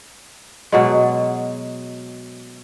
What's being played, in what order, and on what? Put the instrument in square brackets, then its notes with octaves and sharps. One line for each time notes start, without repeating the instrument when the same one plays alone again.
[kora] B2 F#3 G#3